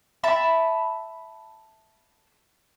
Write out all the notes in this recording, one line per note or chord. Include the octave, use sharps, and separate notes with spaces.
E5 A5 B5